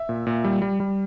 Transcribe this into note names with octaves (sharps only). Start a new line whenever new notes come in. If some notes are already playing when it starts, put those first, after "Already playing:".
Already playing: E5
A#2
A#2
G3
G3
G3